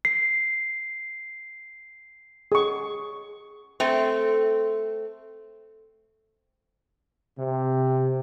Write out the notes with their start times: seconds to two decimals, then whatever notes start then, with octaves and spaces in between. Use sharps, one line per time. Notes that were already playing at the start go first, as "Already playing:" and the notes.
0.05 C7
2.52 G#4 C#6
3.80 A3 C4
7.38 C3